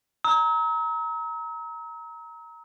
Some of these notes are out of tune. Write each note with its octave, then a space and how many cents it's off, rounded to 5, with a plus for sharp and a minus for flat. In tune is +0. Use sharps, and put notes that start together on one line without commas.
A#5 +0 E6 -45